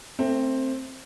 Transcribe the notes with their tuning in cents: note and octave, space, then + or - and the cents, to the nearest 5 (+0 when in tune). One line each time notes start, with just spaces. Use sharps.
A3 +30 C4 +10 E5 +0